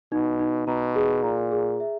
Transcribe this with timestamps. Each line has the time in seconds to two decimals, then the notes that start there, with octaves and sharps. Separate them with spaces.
0.12 B2 D#4
0.40 D#4
0.67 B2 A#5
0.96 G#4
1.23 A#2 A#5
1.52 G#4
1.80 E5